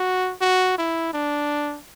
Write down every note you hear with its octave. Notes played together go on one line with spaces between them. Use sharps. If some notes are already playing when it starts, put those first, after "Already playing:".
Already playing: F#4
F#4
E4
D4